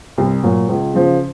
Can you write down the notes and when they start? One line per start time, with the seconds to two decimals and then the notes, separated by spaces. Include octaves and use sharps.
0.18 C2
0.43 A#2 F#3
0.69 C#2
0.94 C#3 F3